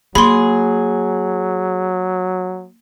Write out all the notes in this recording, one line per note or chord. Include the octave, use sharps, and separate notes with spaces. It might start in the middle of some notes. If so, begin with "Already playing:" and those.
F#3 A#3 G#4 B5 C6